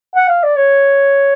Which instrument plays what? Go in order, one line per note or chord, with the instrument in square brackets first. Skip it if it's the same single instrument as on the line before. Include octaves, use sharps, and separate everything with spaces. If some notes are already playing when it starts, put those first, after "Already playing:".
[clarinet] F#5
F5
D5
C#5